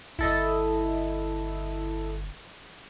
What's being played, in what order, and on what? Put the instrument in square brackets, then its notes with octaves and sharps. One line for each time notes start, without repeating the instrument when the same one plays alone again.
[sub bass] G1 [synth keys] E4 A4 D#5